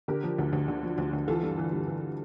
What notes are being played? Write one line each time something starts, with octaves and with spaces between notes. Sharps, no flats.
D3 G4 A#4
F3
D2
D2
D3
F3
D2
D2
E3 F4 A4
G2
E3
G2
E3